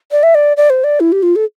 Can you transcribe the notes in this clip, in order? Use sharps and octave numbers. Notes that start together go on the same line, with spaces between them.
D5
E5
D5
D5
C5
D5
E4
G4
F4
A4